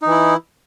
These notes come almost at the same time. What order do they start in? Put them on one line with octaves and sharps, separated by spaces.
D#4 E3 E4